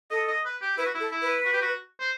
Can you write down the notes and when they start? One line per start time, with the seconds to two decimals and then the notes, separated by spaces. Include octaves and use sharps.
0.11 A4 D#5
0.28 D#5
0.45 B4
0.61 G4
0.78 E4 B4
0.85 F#4
0.95 E4
1.00 A4
1.11 E4
1.22 B4
1.45 F#4
1.53 G4
1.62 F#4
2.00 C5